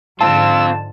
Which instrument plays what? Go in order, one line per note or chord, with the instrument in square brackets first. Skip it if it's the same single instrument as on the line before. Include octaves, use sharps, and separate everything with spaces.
[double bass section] G#2 D3 F3 [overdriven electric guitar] C4 F4 [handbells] A5 [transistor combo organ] E6